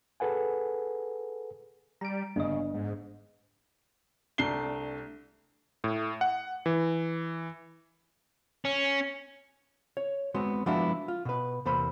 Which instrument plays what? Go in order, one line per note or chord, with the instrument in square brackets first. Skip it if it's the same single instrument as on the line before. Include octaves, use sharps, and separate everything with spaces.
[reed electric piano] G#4 A4 B4 F#5 G#5
[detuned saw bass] G3 [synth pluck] A#5 D7
[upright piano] G1 [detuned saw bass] C#3 [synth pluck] D4 D#5
[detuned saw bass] G#2
[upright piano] C2 A3 D4 C7 G7
[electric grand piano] A2
F#5
E3
[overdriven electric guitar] C#4
[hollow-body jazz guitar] C#5
G#3 B3 C4 F#4
F3 G#3 B3 D4 E4 F#4
F4
B2 B4
E2 C3 A#3 C5 B5